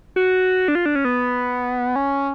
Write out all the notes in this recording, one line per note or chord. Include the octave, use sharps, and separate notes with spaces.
F#4
D4
F4
D4
C#4
B3
C#4